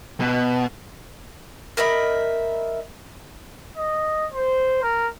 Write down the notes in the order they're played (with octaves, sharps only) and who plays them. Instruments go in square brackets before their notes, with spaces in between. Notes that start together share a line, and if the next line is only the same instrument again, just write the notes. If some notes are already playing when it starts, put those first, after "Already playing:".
[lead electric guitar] B2
[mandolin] A#4 D#5 E5 B5
[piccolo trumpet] D#5
C5
A#4